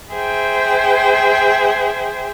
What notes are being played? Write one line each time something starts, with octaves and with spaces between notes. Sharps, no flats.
G#4 C5 E5 G5